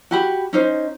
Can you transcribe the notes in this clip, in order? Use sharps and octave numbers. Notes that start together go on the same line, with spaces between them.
F#4 G4 B5
C#4 D#4 C5